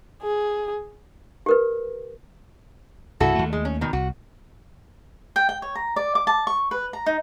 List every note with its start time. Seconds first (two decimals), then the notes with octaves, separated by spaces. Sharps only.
0.22 G#4
1.46 G4 A#4 B4
3.20 C2 G2 C#3 E4 F#4 A4
3.35 D#2 A3
3.53 G#3
3.65 C#4
3.81 B2 D#3 D#4
3.93 C2 F#4
5.36 G5
5.49 G5
5.62 C#5
5.75 A#5
5.96 D5
6.15 D6
6.27 A5
6.47 C#6
6.71 B4
6.93 A#5
7.06 D#4